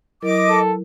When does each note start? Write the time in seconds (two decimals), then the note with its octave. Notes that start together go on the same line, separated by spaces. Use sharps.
0.22 F#3 E4 A#4 D#5 D6
0.48 A4